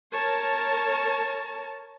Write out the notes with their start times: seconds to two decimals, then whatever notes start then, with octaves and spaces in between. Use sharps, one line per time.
0.11 A#4 C#5 A5